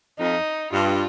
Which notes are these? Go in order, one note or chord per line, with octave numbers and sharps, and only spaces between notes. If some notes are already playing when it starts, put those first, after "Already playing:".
F2 D#4
G2 F4